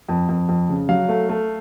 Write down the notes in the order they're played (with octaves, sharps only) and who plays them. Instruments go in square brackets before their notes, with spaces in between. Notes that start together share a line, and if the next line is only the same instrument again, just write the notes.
[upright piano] F2
F2
F2
C#3
F#3 F5
A3
A3